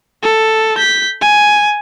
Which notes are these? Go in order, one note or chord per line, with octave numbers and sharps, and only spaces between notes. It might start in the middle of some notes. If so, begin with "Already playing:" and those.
A4
G6 B6
G#5